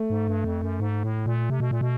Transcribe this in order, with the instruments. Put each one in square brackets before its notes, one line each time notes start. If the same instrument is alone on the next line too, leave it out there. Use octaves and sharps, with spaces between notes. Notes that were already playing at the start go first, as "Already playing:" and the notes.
Already playing: [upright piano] A3
[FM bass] G#2
G2
F2
F#2
G#2
A2
A#2
C3
B2
A#2
B2